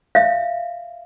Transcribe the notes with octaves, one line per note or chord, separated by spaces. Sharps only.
E5 F5